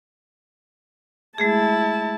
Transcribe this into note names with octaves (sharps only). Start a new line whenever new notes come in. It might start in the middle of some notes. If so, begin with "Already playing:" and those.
G#3 A3 E4 G#4 A5